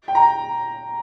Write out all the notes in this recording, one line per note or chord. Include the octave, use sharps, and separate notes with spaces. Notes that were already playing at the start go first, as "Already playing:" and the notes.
G5
A#5